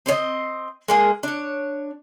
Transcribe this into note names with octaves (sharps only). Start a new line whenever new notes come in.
C4 C5 C#5 D#5
G#3 A#3 G#4
D4 C#5